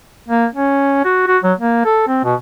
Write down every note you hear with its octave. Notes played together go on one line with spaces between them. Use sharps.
A#3
C#4
F#4
F#4
F#3
A#3
A4
C4
B2